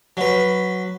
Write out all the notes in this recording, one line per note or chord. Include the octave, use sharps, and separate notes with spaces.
F#3 B4